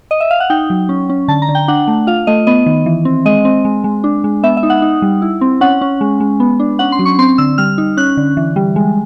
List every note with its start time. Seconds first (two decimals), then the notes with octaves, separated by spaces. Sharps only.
0.11 D#5
0.20 E5
0.31 F5
0.40 F#5
0.50 D#4 G5
0.70 F#3
0.89 C#4
1.09 C#4
1.28 D3 A5
1.42 A#5
1.49 D3
1.55 G5
1.68 D4 F#5
1.87 A3
2.07 F4 F5
2.27 A3 D#5
2.47 B3 D#5
2.66 D#3
2.86 E3
3.05 C4
3.25 G#3 D#5
3.45 C4
3.65 G#3
3.84 G#3
4.04 D4
4.24 G#3
4.43 B3 E5
4.57 E5
4.63 D#4
4.70 F#5
4.82 D#4
5.02 G3
5.22 E4
5.41 C4
5.61 C#4 F#5
5.81 C#4
6.01 G#3
6.20 G#3
6.40 B3
6.60 D4
6.79 C#4 F#5
6.92 C6
6.99 F#3
7.05 C#6
7.18 C4 C6
7.38 D3 E6
7.58 G3 F6
7.78 D#4
7.97 C#4 F#6
8.17 D3
8.37 E3
8.56 G3
8.76 G#3